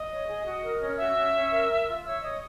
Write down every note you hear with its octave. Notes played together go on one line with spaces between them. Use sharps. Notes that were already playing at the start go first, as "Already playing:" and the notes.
Already playing: D#5 D#6
C#5
G#4
F#4
A#4
C#4
F#4 E5 E6
C#4
C#4
A#4
A#4
F4
C#5 E5 E6
C#5 D#5 D#6